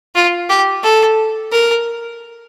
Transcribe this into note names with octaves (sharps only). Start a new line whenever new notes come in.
F4
G4
A4
A#4